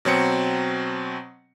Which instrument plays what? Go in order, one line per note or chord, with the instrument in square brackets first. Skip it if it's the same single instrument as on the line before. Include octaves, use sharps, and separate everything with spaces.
[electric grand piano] B2 F#3 C4 C#7